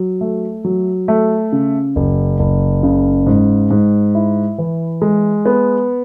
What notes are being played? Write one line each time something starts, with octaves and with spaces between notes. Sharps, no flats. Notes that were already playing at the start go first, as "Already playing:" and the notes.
Already playing: F#3
A3
F#3
A3
C#3
F#1
F#1
C#3
G#2
G#2
E4
E3
G#3
B3